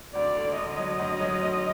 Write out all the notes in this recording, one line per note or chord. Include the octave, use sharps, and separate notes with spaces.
D2 D5
D3
D3 D#5
F#3
D2
F#3
D2